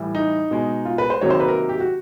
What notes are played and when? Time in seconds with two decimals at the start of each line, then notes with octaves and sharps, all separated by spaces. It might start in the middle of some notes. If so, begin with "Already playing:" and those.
Already playing: A2 E3 G3
0.15 D#4
0.51 B2 G#3
0.85 F4
0.98 B4
1.10 C5
1.21 C3 D#3 F#3 A#3 C#5
1.30 C5
1.40 B4
1.48 A#4
1.69 G4
1.80 F#4